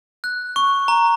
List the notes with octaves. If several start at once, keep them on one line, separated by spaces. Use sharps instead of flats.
F#6
C#6
A#5